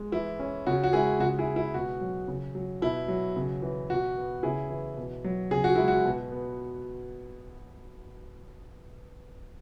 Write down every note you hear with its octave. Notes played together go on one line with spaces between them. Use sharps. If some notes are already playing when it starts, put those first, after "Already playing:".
Already playing: G#3
E3 E4
C#4
C#3 F#4
F#4
G#3 E4 G#4
C#3 F#4
E4 G#4
G#3
E4
B2 F#4
F#3
C#3
F#3
B2 E4
F#3
C#3
E3
B2 F#4
B3
C#3 E4 G#4
E3
B2
F#3
C#3 G#4
F#4
G#3 E4
F#4
B2
B3